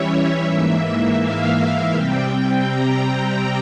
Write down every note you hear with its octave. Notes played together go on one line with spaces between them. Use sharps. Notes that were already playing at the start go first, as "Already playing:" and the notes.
Already playing: E3 G3 C#4 E4 C#5 E5
G#2 E3 A#3 E5
F5
C3 G3 C4 G5
A#5